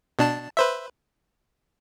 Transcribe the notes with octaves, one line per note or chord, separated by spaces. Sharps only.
B2 D4 A5
B4 C5 E5